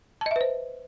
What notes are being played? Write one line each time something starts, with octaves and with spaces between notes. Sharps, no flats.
B4 C5 D#5 E5 A5